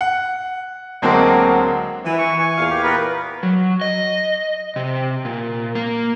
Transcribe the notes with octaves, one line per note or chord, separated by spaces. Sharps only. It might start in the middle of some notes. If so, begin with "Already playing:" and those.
F#5
D2 F#3 G#3 A#3 C4 D4
E3
C#6
G#5 C#6
E2 A#2 F5
G4
B3 A#4 B4
F#3
D#5
C3
A#2
A#3